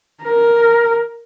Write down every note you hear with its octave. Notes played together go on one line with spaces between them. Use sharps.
A#4